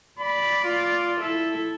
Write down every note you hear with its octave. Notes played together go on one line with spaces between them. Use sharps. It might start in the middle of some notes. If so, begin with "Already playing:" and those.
D5 B5
F4
E4 A4 E5